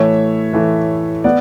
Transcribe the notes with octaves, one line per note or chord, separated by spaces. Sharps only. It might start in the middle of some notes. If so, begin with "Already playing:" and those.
Already playing: A2 E3 A3 C#5 E5
A2 E3 A3
B3 D5 F#5